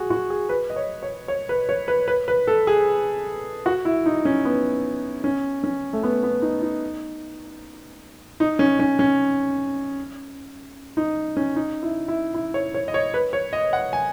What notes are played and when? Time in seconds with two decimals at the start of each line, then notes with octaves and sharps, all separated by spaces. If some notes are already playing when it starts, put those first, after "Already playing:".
Already playing: F#4 G#4
0.10 F#4
0.30 G#4
0.49 B4
0.70 D#5
0.76 C#5
1.03 C#5
1.28 C#5
1.49 B4
1.69 C#5
1.88 B4
2.08 B4
2.28 B4
2.47 A4
2.67 G#4
3.66 F#4
3.85 E4
4.06 D#4
4.25 C#4
4.45 B3
5.24 C#4
5.64 C#4
5.93 A3
6.03 B3
6.23 B3
6.42 D#4
6.62 D#4
8.40 D#4
8.59 C#4
8.80 C#4
8.99 C#4
10.97 D#4
11.37 C#4
11.56 D#4
11.83 E4
12.08 E4
12.34 E4
12.54 C#5
12.74 C#5
12.88 D#5
12.94 C#5
13.14 B4
13.33 C#5
13.53 D#5
13.73 F#5
13.93 G#5